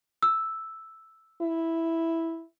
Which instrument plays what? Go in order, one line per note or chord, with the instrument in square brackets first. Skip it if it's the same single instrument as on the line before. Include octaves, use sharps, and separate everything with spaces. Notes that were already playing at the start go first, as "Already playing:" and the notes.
[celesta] E6
[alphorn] E4